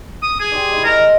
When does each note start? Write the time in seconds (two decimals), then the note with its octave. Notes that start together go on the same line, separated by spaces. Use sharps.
0.23 D#6
0.40 G#4
0.52 G4 C5 D5
0.72 G#3 E4
0.84 A#4 C5 D#5 A#5